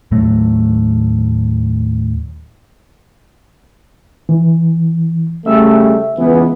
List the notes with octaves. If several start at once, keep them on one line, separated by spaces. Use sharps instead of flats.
D#2 A2 F#3 A3
E3
C#3 G3 A3 E5 E6
E5
C#2 E3 B3